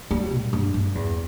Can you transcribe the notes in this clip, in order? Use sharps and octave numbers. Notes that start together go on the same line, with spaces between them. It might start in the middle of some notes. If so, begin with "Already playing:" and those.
G3
A#2
G2
G2
E2